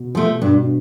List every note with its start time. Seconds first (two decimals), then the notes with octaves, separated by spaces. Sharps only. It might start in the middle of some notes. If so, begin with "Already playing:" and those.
Already playing: B2
0.15 F3 A3
0.42 G2